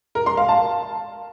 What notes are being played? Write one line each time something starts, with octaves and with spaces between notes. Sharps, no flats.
A#4
C6
F5
A5